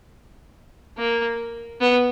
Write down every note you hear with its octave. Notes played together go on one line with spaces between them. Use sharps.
A#3
B3